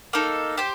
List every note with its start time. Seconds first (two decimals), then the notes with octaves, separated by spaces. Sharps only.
0.13 A#3 D#4 A4
0.57 G4 C5 G5